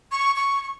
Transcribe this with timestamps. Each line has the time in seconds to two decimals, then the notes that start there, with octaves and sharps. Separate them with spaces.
0.12 C#6
0.36 C#6
0.61 C#6